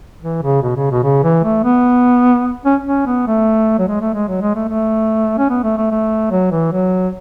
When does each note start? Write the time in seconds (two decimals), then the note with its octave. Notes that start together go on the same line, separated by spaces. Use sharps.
0.22 E3
0.42 C#3
0.62 B2
0.76 C#3
0.91 B2
1.03 C#3
1.23 E3
1.44 A3
1.64 B3
2.66 C#4
2.86 C#4
3.06 B3
3.27 A3
3.79 F#3
3.87 G#3
4.01 A3
4.14 G#3
4.28 F#3
4.41 G#3
4.55 A3
4.69 A3
5.38 C#4
5.50 B3
5.63 A3
5.77 A3
5.91 A3
6.31 F#3
6.51 E3
6.72 F#3